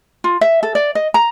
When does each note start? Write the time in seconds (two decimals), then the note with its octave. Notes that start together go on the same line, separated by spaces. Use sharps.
0.24 F4
0.41 E5
0.63 A4
0.75 D5
0.95 D#5
1.14 A#5